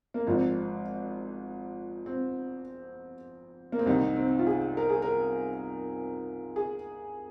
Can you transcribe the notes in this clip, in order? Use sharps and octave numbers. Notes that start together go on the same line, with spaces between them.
A#3
G#1 G#2 F3 C4
C4
A#3
C4
C2 C3 D#3 D#4
C4
F4
G#4
A#4
G#4
A#4
G#4